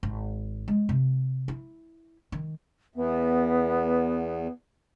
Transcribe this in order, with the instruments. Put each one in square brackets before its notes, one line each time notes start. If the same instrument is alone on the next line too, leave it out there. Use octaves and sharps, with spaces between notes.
[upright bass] G#1
G#3
C3
E4
D#3
[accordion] E2 [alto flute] B3